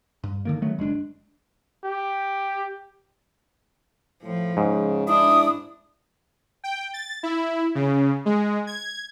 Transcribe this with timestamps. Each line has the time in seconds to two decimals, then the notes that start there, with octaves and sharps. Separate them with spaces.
0.23 G2
0.45 D3 D#3 A#3
0.62 D#3 F#3 A3 B3
0.79 F#1 G#3 C#4 D4
1.84 G4
4.23 A2 F3
4.57 G#2 C#3
5.08 D4 E4 D#6
6.64 G5
6.93 A6
7.23 E4
7.75 C#3
8.26 G#3
8.67 G#6